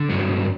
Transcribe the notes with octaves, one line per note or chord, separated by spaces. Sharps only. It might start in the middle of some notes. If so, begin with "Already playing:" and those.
Already playing: D3
G2 F#3